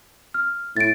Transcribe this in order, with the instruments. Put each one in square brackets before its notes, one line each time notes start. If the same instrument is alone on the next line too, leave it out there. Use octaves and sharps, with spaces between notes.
[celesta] F6
[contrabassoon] A2 [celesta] A6 D7